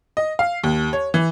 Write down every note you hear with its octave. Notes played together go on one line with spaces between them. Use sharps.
D#5
F5
D#2
C#5
E3